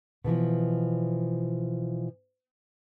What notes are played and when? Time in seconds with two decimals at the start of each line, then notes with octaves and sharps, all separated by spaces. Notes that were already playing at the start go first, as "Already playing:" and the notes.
0.24 B2 D3 E3 F3